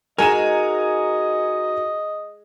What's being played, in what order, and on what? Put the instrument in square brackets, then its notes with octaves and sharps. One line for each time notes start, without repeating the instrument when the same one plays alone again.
[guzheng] G#3 [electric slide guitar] D#4 F#4 A#4 [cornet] D#5 [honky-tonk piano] G#5 A#5 E7